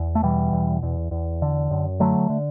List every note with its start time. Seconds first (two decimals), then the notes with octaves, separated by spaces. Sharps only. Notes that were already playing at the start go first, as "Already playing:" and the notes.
Already playing: E2
0.15 A3
0.23 B2 E3 G3
0.53 E2
0.83 E2
1.11 E2
1.42 D3
1.71 F#2
2.00 D3 F#3 A3
2.30 D3